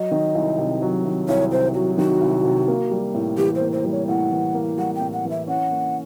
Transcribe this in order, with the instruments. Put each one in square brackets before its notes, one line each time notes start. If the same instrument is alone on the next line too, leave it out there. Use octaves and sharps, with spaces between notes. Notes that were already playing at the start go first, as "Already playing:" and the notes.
Already playing: [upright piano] F#3 [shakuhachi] D#5
[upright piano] D#3
C2
C3
F#3
D#3
[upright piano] C2 [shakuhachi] C#5
[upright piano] C3 [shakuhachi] C5
[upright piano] F#3 [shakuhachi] F#4
[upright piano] D#3 [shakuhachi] F#4
[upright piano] C2
C3
A#3
G3
A2
[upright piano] E3 [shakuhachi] G4
[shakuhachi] C5
[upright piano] A#3
[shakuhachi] C5
[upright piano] G3
[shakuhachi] C#5
[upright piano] A2 [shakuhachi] F#5
[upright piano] E3
A#3
[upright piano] G3 [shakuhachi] F#5
[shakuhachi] G5
[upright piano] A2
[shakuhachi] F#5
[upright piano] E3
[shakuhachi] E5
[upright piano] C#4 [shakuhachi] F#5
[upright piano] A#3